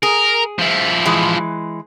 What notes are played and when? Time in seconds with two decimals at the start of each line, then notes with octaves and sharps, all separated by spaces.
0.03 G#4 A#4
0.59 F3 E4
1.06 E3 G#3